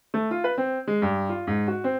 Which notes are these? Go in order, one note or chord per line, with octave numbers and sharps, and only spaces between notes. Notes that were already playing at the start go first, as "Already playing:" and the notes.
A3
F4
B4
C4
G#3
G2
F4
G#2
F#4
C4